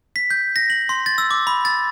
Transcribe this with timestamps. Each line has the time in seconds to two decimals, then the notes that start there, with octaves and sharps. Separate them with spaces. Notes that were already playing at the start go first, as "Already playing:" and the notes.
0.16 B6
0.30 G6
0.56 A#6
0.70 F#7
0.89 C6
1.06 A6
1.18 E6
1.31 D6
1.47 B5
1.65 A6